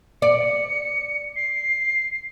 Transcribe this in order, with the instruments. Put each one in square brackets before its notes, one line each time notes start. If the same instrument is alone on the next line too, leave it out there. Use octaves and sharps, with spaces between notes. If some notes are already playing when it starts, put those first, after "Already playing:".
[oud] D5 [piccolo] C#7
[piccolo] C7